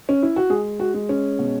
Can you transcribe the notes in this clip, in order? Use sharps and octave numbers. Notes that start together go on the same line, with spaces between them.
C#4
E4
F#4
G#3 G#4
F#4
G#3
C#4
B2